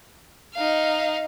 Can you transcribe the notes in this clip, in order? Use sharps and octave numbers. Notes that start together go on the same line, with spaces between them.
D#4 F5